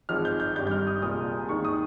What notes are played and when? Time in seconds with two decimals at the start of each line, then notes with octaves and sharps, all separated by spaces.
0.09 G#1 G#2 F3 G#3 F6
0.25 G6
0.40 G6
0.56 G#1 G2 G3 G6
0.67 G6
0.71 F6
0.87 D#6
1.02 C2 A#2 G#3 D#6
1.49 D#2 D#3 G#3 C#6
1.65 D#6